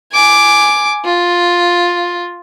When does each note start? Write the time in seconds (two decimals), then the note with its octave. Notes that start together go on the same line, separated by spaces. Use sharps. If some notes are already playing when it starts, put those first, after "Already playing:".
0.13 G#5 D6
1.05 F4